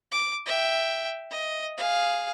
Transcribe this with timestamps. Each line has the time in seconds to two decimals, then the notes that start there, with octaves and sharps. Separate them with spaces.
0.12 D6
0.46 E5 G5
1.31 D#5
1.77 G#4 F5